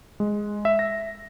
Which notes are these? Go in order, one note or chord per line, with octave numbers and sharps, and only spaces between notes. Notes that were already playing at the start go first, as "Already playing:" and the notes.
G#3
E5
A#6